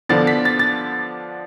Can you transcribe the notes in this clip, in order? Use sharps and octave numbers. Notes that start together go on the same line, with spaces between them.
D3 F3 B3 D4 A6
B6
A6
A6